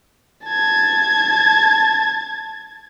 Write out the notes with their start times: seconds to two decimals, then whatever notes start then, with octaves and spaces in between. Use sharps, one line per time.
0.46 A5 G#6